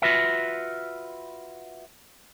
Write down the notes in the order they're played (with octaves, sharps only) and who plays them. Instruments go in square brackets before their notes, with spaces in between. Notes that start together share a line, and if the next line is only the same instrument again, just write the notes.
[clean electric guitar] F4 F#4 B4 E5